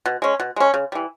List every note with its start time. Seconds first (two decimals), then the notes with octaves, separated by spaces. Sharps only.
0.06 B2
0.22 G#3 C#4
0.40 B2
0.56 G#3 C#4
0.74 C#3
0.92 E3 G3